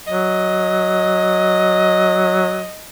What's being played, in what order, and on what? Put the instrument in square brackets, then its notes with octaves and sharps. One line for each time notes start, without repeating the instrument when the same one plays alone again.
[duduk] F#3 [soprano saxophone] D#5